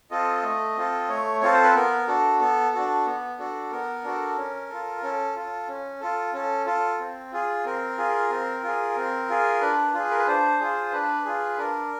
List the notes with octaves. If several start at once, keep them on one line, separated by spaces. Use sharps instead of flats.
C4 F4 A4 D#5
A3 D#5
C4 F4 A4
A3 C#5
C4 F4 A4 C#5
C5
B4
B3 A#4
D4 F#4 A4
B3 A4
D4 F#4 A4
B3
D4 F#4 A4
B3 A#4
D4 F#4 A4
C#4
F4 A4
C#4 A4
F4 A4
C#4
F4 A4
C#4 A4
F4 A4
C4
F4 G#4
C4 A#4
F4 G#4
C4
F4 G#4
C4
F4 G#4
D4 B4
F4 G#4
A#4
B4
D4 C5
F4 G#4
D4 B4
F4 G#4
D4 A#4